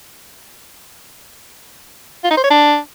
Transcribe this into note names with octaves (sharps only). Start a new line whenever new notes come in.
F4
D#4
C5
C#5
D4